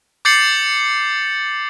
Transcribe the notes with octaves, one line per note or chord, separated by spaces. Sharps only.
D6 G6 A6 C7 C#7 F#7